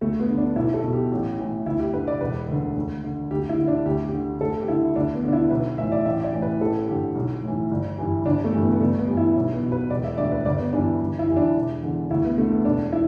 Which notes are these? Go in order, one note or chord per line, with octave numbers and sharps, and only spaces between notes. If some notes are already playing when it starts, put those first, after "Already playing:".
D2 A3
B3
D3
D4
B1 E4
A4
B2
G4
A1
A2 E3
D2 E4
G4
D3 B4
D5
E1 B4
D2 D3
D2
D3
D2 G4
E4
D3
D4
D2 G4
G4
D3
D2 A4
G4
D3 E4
D2 D4
B3
D3 D4
E4
B1 B4
A2 E3 E5
D5
A1 E5
D5
A2 E3
B4
A1 A4
G2 D3 G4
B1
A2 E3
G1
G2 E3
G1 D4
A3
G2 E3
B3
B3
G1 A3
B3
G2 E3
E4
B1
B3
B2
B4
E1 D5
E5
D2 D3 D5
B4
G1 D5
B3
G2 E3 D4
G1
E4
G2 E3
D4
E1
E2 D3
D2 E4
B3
D3 A3
B3
E1 D4
E4